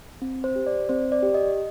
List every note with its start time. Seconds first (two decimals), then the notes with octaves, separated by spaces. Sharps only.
0.22 C4
0.44 C5
0.56 G4
0.66 D5
0.89 C4 C5
1.12 D5
1.23 G4
1.34 D#5